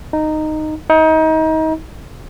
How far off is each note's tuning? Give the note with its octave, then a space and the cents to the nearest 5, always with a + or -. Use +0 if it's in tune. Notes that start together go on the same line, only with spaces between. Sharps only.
D#4 -10
D#4 +30